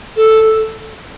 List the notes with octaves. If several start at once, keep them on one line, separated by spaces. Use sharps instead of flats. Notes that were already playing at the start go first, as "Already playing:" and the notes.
A4